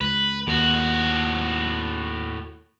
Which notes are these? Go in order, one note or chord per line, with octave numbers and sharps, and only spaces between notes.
C#2 B4
D#2 A2 F#4